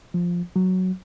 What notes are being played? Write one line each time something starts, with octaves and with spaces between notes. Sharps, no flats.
F3
F#3